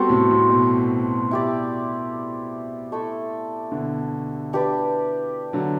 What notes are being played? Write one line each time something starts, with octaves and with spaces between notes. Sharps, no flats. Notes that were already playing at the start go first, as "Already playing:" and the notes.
Already playing: G3 B3 C4 F#4 A4 C5
A2 C3
A2
B2
E4 G4 D5
A3 E4 A4
B2 D3
D4 G4 B4 D5
D3 F#3